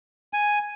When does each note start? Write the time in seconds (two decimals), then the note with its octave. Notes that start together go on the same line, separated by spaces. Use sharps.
0.33 G#5